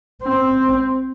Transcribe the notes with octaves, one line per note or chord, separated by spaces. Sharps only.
C4